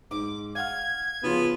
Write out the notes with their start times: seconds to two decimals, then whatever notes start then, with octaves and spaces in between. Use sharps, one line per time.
0.11 G#2 D6
0.55 F5 F#5 F6 G#6
1.23 C#3 F3 B3 F4